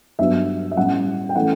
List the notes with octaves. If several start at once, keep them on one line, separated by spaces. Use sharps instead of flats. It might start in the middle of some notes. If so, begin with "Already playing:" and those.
G2 F#3 B3 D4 E5
E5
A2 G3 C#4 F#5
G5
E3 A3 C#4 F#5